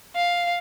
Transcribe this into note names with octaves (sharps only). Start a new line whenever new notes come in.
F5